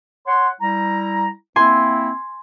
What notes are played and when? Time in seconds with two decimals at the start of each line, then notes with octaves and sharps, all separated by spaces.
0.26 C#5 F#5 C6
0.60 G3 E4 A#5
1.56 A#3 C4 E4 G#5 C6